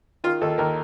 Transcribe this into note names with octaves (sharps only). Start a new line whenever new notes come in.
D#3 F4
D#2 A4
D#2 A#4